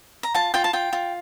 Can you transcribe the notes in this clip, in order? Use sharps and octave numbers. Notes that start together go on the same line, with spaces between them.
A#5
F4 A5
F4 G5
A5
F4 G5
F4